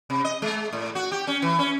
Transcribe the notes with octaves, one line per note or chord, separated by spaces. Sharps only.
C3
D#5
G#3
A2
F#4
G4
C#4
E3
C#4